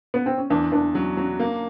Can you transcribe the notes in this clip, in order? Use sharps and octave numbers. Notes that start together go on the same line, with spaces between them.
B3
C4
C#4
E2 D4
E2 D4
F#3 C#4
F#3 C#4
A#3